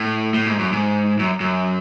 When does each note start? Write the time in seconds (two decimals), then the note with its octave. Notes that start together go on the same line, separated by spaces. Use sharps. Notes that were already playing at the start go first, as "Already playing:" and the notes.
Already playing: A2
0.34 A2
0.46 G#2
0.59 F#2
0.72 G#2
1.19 F#2
1.40 F#2